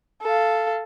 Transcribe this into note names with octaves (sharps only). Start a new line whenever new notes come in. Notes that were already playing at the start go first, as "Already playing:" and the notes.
A4 F5